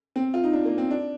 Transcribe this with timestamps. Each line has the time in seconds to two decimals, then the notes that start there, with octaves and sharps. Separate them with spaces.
0.16 C4
0.34 F4
0.43 D#4
0.53 D4
0.65 A#3
0.78 C4
0.90 D4